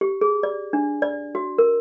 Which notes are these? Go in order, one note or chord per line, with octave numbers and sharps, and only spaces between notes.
G4
G#4
D5
D4
D5
F#4
A#4